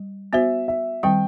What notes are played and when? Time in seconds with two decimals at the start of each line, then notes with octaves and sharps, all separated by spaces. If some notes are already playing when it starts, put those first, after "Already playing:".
Already playing: G3
0.33 B3 F#4 C5 E5
0.68 E5
1.03 D#3 G3 C4 G5